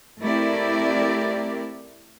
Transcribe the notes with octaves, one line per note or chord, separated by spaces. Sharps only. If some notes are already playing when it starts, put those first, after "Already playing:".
A3 C4 E4 G4 A#4 D5